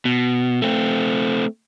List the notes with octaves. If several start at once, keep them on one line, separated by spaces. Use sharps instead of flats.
B2
A3 C4